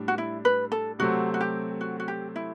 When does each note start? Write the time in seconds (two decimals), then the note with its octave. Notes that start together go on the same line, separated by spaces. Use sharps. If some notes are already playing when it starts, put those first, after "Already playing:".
Already playing: A2 G3 D4
0.08 F#4
0.18 E4
0.45 B4
0.72 A4
0.99 C3 F#3 A3 C4 F#4
1.34 F#4
1.41 G4
1.81 F#4
2.00 F#4
2.08 G4
2.36 E4